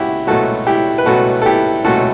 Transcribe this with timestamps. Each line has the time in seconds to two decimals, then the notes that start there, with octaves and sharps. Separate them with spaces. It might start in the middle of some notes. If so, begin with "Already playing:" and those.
Already playing: C#2 B2 E4 F#4 G4
0.27 C#2 B2 F#3 A3 F#4 A4
0.67 E4 G4
0.98 B4
1.06 C#2 B2 F#3 A3 F#4 A4
1.42 A4
1.46 E4 G4
1.85 C#2 B2 F#3 A3 F#4 A4